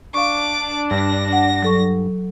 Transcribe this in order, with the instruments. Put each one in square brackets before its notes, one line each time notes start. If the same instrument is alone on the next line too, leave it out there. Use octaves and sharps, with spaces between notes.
[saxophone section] D4 [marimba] F5 C#6 [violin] D6
[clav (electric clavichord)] G2 [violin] A#6
[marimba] F#5
F#3 A4 C#6